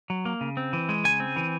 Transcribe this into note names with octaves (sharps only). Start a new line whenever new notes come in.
F#3
A#3
C#3
C4
E3
G#3
C#3 G#5
C4
E3